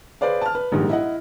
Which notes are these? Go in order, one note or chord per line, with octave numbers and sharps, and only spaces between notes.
G#4 B4 C5 D5 F5
A5 F6
B4
A#1 G#2 D#3 G3
E4 D#5 F#5